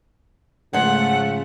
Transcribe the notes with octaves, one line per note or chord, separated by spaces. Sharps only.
G#2 C#3 F3 A3 F#5